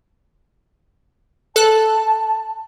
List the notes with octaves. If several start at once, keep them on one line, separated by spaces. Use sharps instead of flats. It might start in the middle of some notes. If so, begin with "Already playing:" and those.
A4 A5 F#6